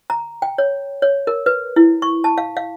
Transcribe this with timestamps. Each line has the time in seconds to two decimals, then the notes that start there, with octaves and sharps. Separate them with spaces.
0.10 A#5
0.42 G5
0.58 C#5
1.02 C#5
1.27 A#4
1.46 B4
1.76 E4
2.02 C#6
2.24 A5
2.38 F5
2.57 F5